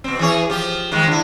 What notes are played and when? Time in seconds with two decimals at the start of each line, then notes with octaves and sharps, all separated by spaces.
0.04 B2 C4
0.19 E3 G#4 C#5
0.50 F3 G4
0.92 D#3 F3 G#3
1.07 D3 E4